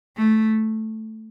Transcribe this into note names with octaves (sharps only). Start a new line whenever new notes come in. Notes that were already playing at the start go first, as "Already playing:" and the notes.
A3